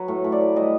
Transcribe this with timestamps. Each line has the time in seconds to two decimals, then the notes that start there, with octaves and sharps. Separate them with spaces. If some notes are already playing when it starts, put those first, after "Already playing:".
Already playing: F#3 B4
0.08 A2
0.24 A2
0.32 D5
0.40 A2
0.56 G3 D#5